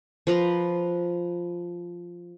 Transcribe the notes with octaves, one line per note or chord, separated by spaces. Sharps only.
F3 B4 A#5 C6